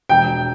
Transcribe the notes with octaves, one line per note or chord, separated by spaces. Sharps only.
E1 G5